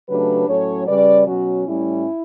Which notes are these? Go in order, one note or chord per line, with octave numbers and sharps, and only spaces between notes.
C#3 F#3 A3 D4 G4 B4
A2 F#3 C#4 A4 C#5
C#3 G3 C#4 B4 D5
B2 F#3 C#4 F#4
A2 G3 C#4 E4